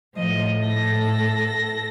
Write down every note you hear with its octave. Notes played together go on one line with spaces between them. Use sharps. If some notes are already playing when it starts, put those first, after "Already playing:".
A2 F3 D#5
A4 A#6